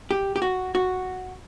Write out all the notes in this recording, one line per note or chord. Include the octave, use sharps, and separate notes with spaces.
G4
G4
F#4
F#4